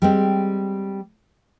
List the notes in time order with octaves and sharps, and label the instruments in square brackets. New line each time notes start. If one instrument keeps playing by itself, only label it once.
[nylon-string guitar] G3 G#3 C4